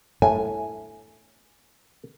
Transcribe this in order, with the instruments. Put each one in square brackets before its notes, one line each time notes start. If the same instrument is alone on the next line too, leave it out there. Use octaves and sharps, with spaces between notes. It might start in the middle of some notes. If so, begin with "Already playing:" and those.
[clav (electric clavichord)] A2 [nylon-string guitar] G#5